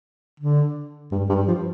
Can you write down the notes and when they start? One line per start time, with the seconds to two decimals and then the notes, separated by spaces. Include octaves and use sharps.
0.40 D3
1.12 G2
1.29 G2
1.48 F3